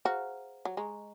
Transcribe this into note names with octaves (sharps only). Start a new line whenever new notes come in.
F#4 G#4 C5 F5 A#5 F6
F#3
G#3 D#5 A#5 C#6